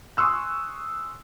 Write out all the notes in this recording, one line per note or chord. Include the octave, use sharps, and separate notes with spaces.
G#5 C6 C#6 D#6 E6 F#6